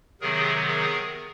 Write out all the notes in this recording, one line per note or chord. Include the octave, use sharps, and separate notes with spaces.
C3 D#3 F#3 B3 G#4 A#4
G#4 A#4